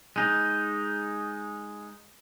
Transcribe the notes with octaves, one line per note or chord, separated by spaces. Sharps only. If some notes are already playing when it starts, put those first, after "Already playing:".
G#3 D#4